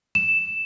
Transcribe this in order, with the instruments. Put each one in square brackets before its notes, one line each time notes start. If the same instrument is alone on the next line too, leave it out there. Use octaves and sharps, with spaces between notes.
[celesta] E7